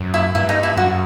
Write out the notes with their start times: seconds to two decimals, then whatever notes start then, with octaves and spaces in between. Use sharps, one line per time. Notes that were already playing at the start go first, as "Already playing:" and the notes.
Already playing: F#2
0.14 E4
0.35 G2 E4
0.49 D#4
0.63 E4
0.77 F#2 F#4